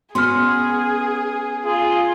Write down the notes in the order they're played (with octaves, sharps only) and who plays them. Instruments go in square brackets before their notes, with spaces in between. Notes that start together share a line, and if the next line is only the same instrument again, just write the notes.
[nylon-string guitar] B3 C#4 F#4 [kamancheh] G#4 [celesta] C6 F6
[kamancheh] F4 [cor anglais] G#4